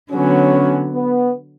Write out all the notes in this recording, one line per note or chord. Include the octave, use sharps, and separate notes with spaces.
D3 F#3 B3 C#4
B3